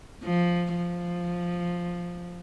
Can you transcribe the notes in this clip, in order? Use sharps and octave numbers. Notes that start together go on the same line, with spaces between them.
F3
F3